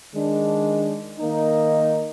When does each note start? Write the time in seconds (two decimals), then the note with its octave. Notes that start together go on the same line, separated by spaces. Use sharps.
0.13 D#3 G#3 D4
1.18 D#3 A#3 D#4